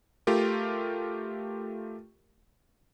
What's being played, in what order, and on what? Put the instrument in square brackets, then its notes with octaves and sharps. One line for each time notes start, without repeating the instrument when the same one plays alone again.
[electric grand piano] A3 F4 G4 A#4